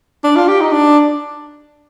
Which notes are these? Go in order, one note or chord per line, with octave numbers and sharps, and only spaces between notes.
D4
F4
G4
D#4
D4